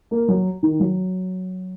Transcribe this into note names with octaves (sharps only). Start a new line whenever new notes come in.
A#3
F#3
D#3
F#3